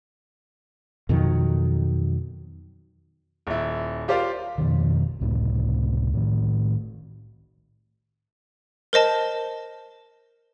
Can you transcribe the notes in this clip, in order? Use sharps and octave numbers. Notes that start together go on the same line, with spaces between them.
F2 B2 D#3 F#3
D#1 E4
F4 G4 A#4 C5 D5 F5
F2 B2 D#3
C#2 A2 C3
A2 D#3
A#4 C5 D#5 A5